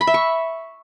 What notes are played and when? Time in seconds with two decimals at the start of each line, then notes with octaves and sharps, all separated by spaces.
0.01 B5
0.07 E5
0.14 C#6